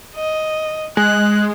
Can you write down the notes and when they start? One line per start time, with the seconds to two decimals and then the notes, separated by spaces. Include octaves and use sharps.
0.15 D#5
0.97 G#3 F#6